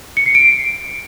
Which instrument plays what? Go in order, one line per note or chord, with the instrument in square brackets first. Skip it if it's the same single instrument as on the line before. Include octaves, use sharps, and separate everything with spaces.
[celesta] C#7
C7
D7